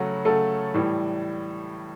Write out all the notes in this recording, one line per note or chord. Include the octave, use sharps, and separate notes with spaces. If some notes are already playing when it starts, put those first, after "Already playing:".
Already playing: C#3 F#3 A3 F#4
C#3 F#3 A3 A4
A2 E3 G3